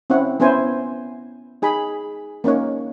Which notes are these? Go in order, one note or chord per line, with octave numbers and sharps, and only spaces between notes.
C4 C#4 E4 C#5 F#5
B3 C#4 E4 C5 G#5
D#4 G#4 G#5 B5
A#3 C#4 D#4 C#5